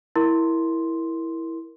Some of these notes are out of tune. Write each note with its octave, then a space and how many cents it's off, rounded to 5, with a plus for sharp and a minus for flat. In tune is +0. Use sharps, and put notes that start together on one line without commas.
E4 -5 A#4 +0 C6 +0